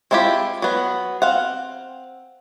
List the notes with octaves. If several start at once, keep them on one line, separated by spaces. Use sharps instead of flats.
G#3 C4 E4 F4 G4
F#3 B3
C4 F5 F#5